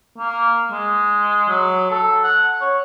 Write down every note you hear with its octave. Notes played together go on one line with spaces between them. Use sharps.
A#3
G#3
F#3
A4
F#5
C#5